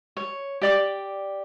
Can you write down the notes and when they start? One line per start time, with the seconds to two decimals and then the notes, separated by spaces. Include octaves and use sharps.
0.17 C#5
0.62 G4 D5 D6